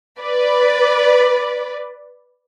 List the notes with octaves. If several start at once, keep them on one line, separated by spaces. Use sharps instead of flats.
B4 D5